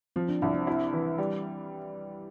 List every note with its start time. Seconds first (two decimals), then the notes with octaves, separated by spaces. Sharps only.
0.16 F3 C4
0.29 D4
0.42 C2 D4
0.54 C4
0.67 E4
0.93 E3
1.18 G3